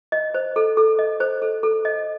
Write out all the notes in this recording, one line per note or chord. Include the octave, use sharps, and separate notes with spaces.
D#5
C5
A4
A4
D#5
C5
A4
A4
D#5